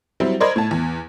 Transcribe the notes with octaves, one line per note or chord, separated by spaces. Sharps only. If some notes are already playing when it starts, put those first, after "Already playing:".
F#3 G3 C4 E4
A#4 C5 D5 D#5 B5 G#6
A2 A5
E2